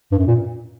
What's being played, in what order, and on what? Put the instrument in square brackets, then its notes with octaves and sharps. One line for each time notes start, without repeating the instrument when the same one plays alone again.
[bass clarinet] G2
F#2
A#2